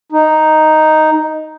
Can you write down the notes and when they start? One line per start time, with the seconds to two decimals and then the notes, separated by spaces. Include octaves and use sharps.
0.12 D#4